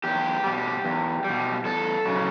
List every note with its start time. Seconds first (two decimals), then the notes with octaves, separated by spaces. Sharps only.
0.04 E2 G4
0.44 B2 G3
0.85 E2
1.24 G3
1.29 B2
1.64 E2 A4
2.05 C#3 F#3